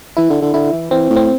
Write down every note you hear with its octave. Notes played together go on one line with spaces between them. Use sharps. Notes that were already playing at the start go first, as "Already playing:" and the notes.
E3 E4
D3
D3
D3 E4
E3
E3 C4
A2
C4